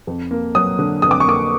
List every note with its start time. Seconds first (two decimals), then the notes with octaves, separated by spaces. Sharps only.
0.07 F2
0.31 A#3
0.55 F#3 D#6
0.79 D3
1.02 F2 D#6
1.11 D6
1.20 C#6
1.26 A#3 D6